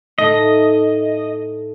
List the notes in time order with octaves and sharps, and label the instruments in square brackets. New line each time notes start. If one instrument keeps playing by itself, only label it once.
[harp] A2 A3 D#4 [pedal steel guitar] D#5